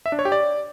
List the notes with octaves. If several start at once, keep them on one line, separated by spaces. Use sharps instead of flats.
E5
D4
C#5
G4
D5